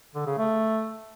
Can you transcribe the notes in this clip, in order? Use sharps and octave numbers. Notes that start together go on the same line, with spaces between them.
D3
C#3
A3